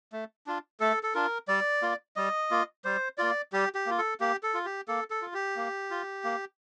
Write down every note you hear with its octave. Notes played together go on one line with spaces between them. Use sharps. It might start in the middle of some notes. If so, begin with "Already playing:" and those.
A3
D4 F4
A3 A4
A4
D4 F4 A#4
G3 D5
A#3 F4
G3 D#5
A#3 F4
G3 C5
A#3 F4 D5
G3 G4
G4
A#3 F4
A4
A#3 G4
A4
F4
G4
A#3 A4
A4
F4
G4
A#3
F4
A#3